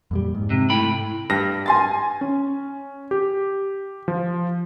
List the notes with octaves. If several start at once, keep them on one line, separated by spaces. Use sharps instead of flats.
F2 A#2 G3
G#2
C3
A2 G5 B5
G2 A#6
G#5 C6 A6
C#4
G4
F3